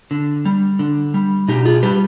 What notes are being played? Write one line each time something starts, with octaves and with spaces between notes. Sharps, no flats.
D3
G3
D3
G3
B2 D#4 G4
F4 G#4
G3 G4 B4